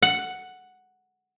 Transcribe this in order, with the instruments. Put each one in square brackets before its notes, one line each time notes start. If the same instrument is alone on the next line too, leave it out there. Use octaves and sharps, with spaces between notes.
[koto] F#5